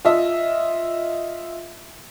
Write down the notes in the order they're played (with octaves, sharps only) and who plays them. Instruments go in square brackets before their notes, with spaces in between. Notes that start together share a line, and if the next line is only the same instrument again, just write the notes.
[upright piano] F4 D#5 E5